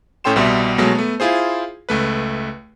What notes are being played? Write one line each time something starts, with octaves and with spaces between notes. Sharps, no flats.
A2 C#4 A4 G5 C6 E7
C2 B2 G3 E5 C6
B2 F#3 G#3 A3
A3 B3
E4 F4 G#4 C5
C#2 A3 B4